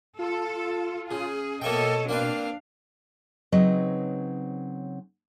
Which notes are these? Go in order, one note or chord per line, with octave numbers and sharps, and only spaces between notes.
F4 A4
C#3 G#4
B2 A#3 A4 C#5 D#5 E5 G5
A#3 C4 D4 B4 F5
C#3 F#3 C4 D#4 B4 D#5